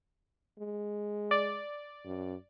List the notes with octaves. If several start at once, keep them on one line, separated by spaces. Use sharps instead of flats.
G#3
D5
F#2